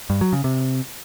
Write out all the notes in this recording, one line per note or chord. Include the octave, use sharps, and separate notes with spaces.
G2
F#3
C#3
C3